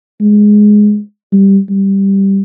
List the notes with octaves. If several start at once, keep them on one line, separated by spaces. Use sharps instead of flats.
G#3
G3
G3